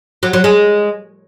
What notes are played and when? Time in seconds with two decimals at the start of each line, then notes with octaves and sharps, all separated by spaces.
0.23 F#3
0.33 F#3
0.44 G#3